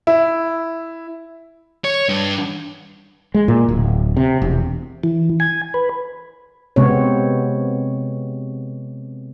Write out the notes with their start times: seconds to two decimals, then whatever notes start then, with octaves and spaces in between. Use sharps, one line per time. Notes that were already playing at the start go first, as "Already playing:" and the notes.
0.07 E4
1.84 C#5
2.09 G2
3.34 G#3
3.48 A#2
3.69 D1
4.17 C3
4.42 E1
5.04 E3
5.40 G#5
5.74 B4
6.76 C3 G#3 B3 C4 C#5